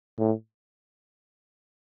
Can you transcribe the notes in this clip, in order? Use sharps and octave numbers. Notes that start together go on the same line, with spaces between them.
A2